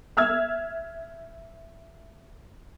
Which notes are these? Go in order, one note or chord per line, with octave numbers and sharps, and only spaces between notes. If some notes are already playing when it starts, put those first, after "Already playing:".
E5 E6 F6 G#6